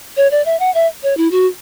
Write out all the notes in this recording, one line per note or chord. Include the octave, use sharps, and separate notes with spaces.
C#5
D5
E5
F#5
E5
C#5
E4
F#4